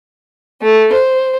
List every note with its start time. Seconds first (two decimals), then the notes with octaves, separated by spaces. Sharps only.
0.62 A3
0.94 C5